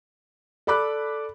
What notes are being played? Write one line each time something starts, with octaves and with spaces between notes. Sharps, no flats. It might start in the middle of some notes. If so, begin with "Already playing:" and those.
A4 D5 B5 D6 F#6